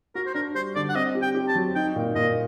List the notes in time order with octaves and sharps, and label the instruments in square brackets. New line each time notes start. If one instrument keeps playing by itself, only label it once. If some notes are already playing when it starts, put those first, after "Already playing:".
[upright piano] F#4 [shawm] A#4
[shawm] C5
[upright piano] D4 [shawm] A#4
[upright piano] G3 [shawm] C5
[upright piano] D3 [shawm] D5
[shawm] F#5
[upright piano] C4 [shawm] D#5
[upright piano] G4
[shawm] G5
[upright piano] G4
[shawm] A5
[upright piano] F#3
[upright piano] D#4 [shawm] G5
[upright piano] A#2
[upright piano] A#2 [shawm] D#5